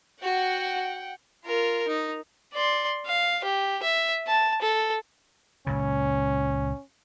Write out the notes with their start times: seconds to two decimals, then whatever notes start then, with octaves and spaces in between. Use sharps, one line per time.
0.22 F#4 F#5 G5
1.45 F4 A#4
1.88 D#4
2.54 D5 C6
3.06 F5
3.44 G4
3.83 E5
4.27 A5
4.62 A4
5.67 C#2 A#2 C#3 C#4